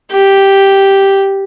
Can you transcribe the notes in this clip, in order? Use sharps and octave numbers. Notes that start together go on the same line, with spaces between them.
G4